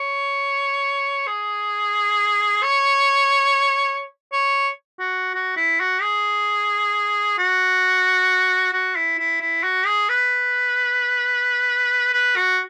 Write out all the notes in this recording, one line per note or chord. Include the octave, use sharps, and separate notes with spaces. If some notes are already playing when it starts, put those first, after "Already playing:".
Already playing: C#5
G#4
C#5
C#5
F#4
F#4
E4
F#4
G#4
F#4
F#4
E4
E4
E4
F#4
G#4
B4
B4
F#4